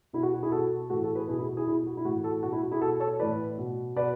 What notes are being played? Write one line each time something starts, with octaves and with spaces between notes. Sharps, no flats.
B2 E4
F#4
F#4
E4 G#4
B2 F#4 A4
A2 E3 F#4 A4
F#4 A4
G#4 B4
B2 E4 G#4
E4
F#4
E4 G#4
B2 E4
F#4
E4
A2 E3 F#4
F#4 A4
B2 F#4
E4
F#4
E4 G#4
B2 F#4 A4
A4 C#5
A2 E3 B4 D5
B2
B2 B4 D5